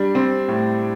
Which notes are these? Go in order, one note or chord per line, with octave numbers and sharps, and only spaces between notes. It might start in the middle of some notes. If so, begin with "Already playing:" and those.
Already playing: G3 D4
C4
A2